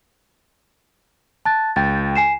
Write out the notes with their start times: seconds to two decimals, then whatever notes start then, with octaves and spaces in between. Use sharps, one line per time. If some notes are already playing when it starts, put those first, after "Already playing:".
1.45 A5 F#6 A6
1.76 C#2 G5 A6
2.16 G#5 C7 E7